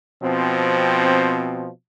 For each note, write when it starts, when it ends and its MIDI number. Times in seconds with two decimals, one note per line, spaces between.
0.22 1.68 47
0.22 1.68 53
0.22 1.68 60